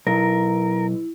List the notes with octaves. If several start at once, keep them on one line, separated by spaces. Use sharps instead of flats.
B1 E4 A#4